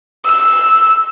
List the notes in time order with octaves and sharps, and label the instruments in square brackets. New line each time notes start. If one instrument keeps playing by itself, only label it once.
[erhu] E6